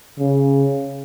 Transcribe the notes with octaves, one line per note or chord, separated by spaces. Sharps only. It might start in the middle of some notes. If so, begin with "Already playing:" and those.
C#3